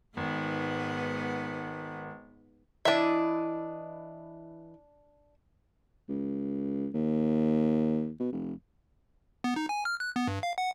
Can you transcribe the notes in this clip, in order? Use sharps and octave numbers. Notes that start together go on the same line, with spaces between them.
G#1 G#2 B3 B4
E3 D4 E4 D#5 E5
C#2
D#2
B2
F1
B3
D#4
G#5
F6
F#6
B3
G2
F5
F#5